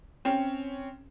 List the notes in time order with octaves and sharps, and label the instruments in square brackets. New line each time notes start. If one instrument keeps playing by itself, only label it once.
[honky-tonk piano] C4 C#4